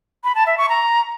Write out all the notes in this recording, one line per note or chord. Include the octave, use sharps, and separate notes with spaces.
B5
A5
E5
C#6
A#5